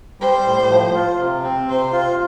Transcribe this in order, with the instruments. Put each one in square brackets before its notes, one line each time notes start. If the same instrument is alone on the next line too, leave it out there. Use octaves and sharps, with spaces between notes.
[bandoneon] G3 [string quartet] C5
[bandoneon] A2
F3
F4
C3
C4
[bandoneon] C3 [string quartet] C5
[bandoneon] F4